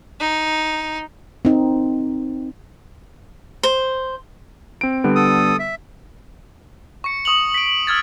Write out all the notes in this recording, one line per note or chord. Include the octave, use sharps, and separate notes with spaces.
D#4
C4 D#4
C5
C4 D7
D3 G3 B3
A4 D#6
E5
C#6 C#7
C#6 D#6 F7 F#7
B6 D7
E6 F6 G#6 A6